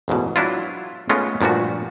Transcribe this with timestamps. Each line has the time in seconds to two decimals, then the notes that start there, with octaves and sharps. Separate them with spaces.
0.08 A1 E2 G#2 B2
0.36 F#3 D4 E4 F4
1.09 G#3 A3 B3 C#4 D#4 F4
1.41 G2 A#2 F3 A3 F#4